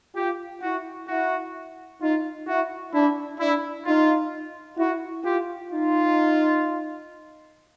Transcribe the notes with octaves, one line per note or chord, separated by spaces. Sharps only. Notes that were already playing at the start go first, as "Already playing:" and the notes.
F4 G4
E4 F#4
E4 F#4
D#4 F4
E4 F#4
D4 E4
D4 E4
D#4 F4
E4 F#4
F4 G4
D#4 F4